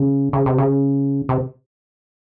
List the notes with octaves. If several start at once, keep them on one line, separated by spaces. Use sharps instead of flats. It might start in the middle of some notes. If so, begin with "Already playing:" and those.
Already playing: C#3
C#3
C3
C#3
C3